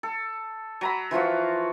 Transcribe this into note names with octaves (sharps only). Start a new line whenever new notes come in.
A4
F#3 A#5 B5
E3 F3 F4 F#4